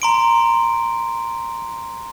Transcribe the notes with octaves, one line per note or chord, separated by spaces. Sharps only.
A#5 C6 D7